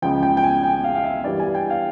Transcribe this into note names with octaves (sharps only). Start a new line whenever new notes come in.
C#2 C#3 F3 G5
G5
G5
G#5
G5
F5
F5
E5
G2 E3 G3 A#3 D5
G#5
G5
F5